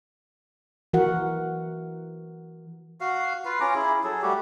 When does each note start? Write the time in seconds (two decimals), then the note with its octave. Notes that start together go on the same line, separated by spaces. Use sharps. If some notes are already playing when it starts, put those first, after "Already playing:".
0.93 E3 F#4 A#4 F#5
3.01 F#4 F5
3.45 F4 B4 F5
3.60 C#4 F4 A#5 D6
3.75 E4 G#4
4.04 F#3 G#4 A4
4.22 G3 A3 F#4 G4